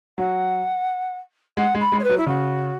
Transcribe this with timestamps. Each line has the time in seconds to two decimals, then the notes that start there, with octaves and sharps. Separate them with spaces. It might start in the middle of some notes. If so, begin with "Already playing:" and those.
0.18 F#3 F#5
1.57 G#3 F#5
1.75 G#3
1.80 B5
1.92 G#3
1.99 C#5
2.03 B4
2.09 F#3
2.17 E4
2.26 C#3 F#4